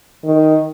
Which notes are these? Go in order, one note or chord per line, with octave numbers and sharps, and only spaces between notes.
D#3